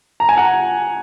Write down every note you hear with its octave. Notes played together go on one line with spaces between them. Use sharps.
A#5
G#5
F#5 A#5